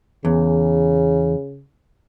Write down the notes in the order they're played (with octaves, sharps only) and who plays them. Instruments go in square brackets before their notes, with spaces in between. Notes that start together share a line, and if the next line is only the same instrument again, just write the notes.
[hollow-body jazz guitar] E2 [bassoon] C#3